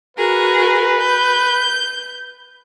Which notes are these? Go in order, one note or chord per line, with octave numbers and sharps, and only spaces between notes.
F#4 G#4 A#4 B4
G6